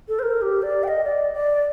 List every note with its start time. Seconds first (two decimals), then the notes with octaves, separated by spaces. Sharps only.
0.08 A4
0.19 C5
0.23 A#4
0.42 G4
0.62 D5
0.84 G5
0.88 D#5
1.04 D5
1.34 D5